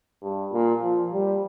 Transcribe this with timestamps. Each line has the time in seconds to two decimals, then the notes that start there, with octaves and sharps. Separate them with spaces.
0.23 G2
0.52 A#2
0.82 F3
1.12 G3